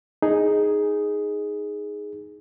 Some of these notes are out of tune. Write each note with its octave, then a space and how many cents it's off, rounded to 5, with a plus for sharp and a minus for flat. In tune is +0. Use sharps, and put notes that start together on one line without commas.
D#4 +0 G#4 +0